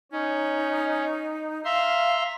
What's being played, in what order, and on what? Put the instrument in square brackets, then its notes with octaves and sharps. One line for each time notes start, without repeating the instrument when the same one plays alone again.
[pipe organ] C#4 [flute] D#4
[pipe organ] E5 A#5 C6 [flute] F5